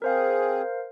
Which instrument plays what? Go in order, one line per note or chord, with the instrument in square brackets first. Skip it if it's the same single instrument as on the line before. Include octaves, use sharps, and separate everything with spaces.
[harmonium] C4 G#4 [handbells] A#4 C5 F5